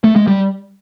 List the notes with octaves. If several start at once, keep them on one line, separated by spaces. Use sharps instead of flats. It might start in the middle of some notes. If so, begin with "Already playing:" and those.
A3
G#3
G3